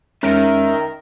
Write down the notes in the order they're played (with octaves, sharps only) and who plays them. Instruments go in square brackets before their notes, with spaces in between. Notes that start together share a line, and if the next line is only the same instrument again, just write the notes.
[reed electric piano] E2 G#3 C#4 [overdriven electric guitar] D#3 [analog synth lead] A#4 [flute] E5